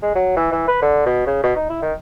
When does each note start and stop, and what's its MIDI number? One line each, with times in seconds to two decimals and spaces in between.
0.02 0.12 56
0.15 0.32 54
0.37 0.47 52
0.52 0.67 52
0.68 0.81 71
0.82 1.03 50
1.06 1.22 47
1.27 1.39 49
1.43 1.52 47
1.56 1.65 63
1.70 1.80 64
1.82 1.93 51